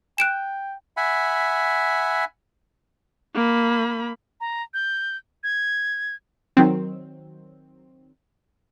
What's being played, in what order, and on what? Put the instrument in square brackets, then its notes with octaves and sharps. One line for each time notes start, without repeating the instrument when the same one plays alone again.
[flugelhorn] G5 [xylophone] F#6 D7 E7
[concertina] E5 F#5 G#5 B5
[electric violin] A#3 B5
[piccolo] A#5
G6
G#6
[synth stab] D#3 F#3 C4